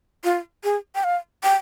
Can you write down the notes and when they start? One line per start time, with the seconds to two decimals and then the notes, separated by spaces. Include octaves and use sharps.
0.24 F4
0.64 G#4
0.95 G5
1.04 F5
1.44 G5